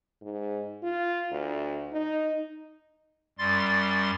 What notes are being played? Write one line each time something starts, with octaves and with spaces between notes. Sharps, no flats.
G#2
F4
D2
D#4
F#2 G3 C6 A6